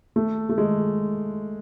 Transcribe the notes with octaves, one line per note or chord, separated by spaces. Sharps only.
A3
A3
G#3